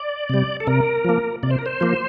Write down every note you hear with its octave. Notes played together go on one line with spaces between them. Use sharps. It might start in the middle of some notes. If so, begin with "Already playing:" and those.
Already playing: D5
C3 G3
A4
C3 A#4
F3 A#3
C3 D5
C5
A#4
C5
F3 A#3